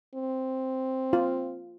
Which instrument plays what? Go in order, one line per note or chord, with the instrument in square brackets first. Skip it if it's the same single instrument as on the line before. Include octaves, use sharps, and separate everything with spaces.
[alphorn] C4
[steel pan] F4